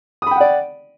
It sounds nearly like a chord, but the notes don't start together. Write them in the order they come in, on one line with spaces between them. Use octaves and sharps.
D#6 B5 G5 F#5 D5